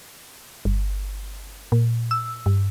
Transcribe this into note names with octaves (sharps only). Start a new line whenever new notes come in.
G1
A#2
E6
G2